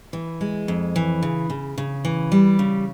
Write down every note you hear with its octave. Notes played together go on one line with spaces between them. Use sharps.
E3
G#3
F2
E3
C#3
C#3
C#3
E3
G3
C#3